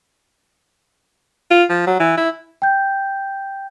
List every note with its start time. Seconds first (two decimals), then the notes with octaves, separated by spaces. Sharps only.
1.51 F4
1.69 F3
1.87 F#3
2.00 E3
2.17 E4
2.62 G5 G6